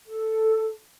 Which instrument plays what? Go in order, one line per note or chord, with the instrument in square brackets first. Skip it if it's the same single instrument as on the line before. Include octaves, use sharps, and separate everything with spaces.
[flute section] A4